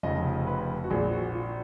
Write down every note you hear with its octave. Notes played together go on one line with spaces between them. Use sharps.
F1 F2 C#3 D#5
B4
F#4
A#1 A#2 G#4
F#4
F4